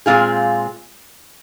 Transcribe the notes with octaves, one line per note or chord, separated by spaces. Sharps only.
A#2 G#3 C4 F4 G#4